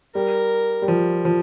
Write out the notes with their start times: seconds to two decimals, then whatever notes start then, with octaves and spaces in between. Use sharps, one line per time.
0.15 G3 A#4
0.82 G3
0.88 F3
1.25 F3